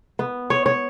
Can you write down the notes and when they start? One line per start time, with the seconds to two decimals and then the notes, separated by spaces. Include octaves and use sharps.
0.19 B3
0.50 C#5
0.66 C#5